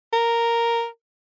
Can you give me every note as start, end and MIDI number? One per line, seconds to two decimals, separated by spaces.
0.13 0.87 70